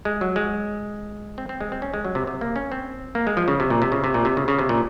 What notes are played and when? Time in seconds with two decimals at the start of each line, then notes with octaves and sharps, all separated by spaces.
0.05 G#3
0.21 F#3
0.36 G#3
1.38 C4
1.49 C4
1.60 G#3
1.72 C4
1.82 C#4
1.94 G#3
2.05 F#3
2.15 C3
2.27 C3
2.41 A#3
2.56 C#4
2.72 C4
3.15 A#3
3.27 G#3
3.37 F3
3.48 C#3
3.60 C3
3.70 A#2
3.82 C3
3.92 C#3
4.04 C3
4.14 A#2
4.25 C3
4.37 C#3
4.48 C#3
4.59 C3
4.69 A#2